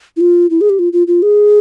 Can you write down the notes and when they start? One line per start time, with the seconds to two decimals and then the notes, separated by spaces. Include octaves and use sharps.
0.17 E4
0.21 F4
0.50 E4
0.61 G#4
0.70 G4
0.79 F4
0.93 F4
1.07 F4
1.22 G#4